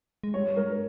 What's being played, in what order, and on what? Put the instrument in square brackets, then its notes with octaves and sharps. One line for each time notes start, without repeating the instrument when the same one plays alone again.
[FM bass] G#3
[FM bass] G3 [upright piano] C#5
[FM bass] G#3 [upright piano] A#4